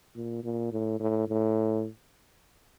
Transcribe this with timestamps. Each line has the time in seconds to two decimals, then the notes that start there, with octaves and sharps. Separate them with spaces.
0.15 A#2
0.44 A#2
0.72 A2
1.00 A2
1.28 A2